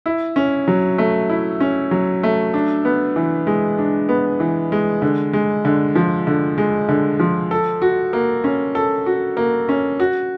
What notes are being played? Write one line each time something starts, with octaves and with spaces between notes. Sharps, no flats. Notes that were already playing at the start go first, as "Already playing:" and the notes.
E4
C#4
F#3
A3
E4
C#4
F#3
A3
D4
B3
E3
G#3
D4
B3
E3
G#3
D3
G#3
D3
F3
D3
G#3
D3
F3
A4
F#4
A#3
C#4
A4
F#4
A#3
C#4
F#4